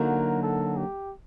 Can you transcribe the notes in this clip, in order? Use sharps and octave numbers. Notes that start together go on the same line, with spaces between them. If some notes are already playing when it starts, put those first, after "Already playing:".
Already playing: D3 F#3 A#3 D#4 F#4 A#4
A4
G4